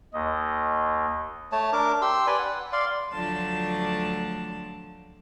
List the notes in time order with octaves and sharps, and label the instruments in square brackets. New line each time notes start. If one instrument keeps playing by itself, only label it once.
[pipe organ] D#2 [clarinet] D#5
[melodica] A3 C#5 A5
D4 A#4 D6
G4 C6 E6
B4 D5 G#5
F#5
D5 F5 C6
[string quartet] D2 F3 F#3 A3 D4 A5